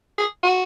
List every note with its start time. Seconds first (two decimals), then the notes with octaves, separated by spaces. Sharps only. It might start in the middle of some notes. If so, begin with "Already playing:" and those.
0.18 G#4
0.43 F#4